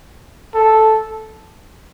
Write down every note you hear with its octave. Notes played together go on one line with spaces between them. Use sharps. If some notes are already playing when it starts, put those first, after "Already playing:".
A4